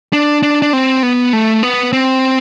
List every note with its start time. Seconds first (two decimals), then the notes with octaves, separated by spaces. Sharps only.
0.13 D4
0.43 D4
0.62 D4
0.73 C4
1.03 B3
1.33 A3
1.63 B3
1.93 C4